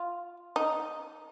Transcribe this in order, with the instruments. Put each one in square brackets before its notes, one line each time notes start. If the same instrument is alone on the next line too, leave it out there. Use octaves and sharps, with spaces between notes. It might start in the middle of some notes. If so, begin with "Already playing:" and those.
Already playing: [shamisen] F4
D#4